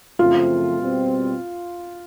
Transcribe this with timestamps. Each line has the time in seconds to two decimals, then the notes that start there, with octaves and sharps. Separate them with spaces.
0.19 F#2 C#3 F3 A3 C4 F4
0.78 B2 G3 C4